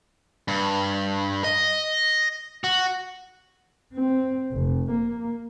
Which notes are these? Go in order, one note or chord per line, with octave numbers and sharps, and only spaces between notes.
G2
D#5
F#4
C4
F1
A#3